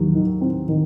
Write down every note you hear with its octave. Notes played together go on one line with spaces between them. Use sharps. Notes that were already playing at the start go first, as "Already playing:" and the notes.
Already playing: D#2 F#3
D#3
C4
D#3